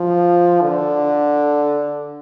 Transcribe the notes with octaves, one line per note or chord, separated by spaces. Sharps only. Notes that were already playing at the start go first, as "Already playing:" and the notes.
Already playing: F3
D3